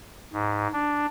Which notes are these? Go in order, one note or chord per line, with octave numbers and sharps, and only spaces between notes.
G#2
D4